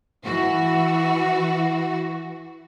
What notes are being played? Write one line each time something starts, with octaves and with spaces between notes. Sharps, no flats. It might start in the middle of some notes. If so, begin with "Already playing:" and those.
E3 F#4